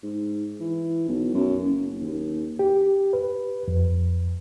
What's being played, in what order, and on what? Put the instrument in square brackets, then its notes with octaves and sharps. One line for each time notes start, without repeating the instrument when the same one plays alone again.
[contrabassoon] G#2
E3
B1
F#2
F#1
D#2
[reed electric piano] G4
B4
F2